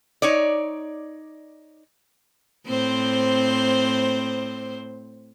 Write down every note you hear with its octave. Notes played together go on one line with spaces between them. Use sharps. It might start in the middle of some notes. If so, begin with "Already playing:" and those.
D#4 C#5 D5
A2 C4 C5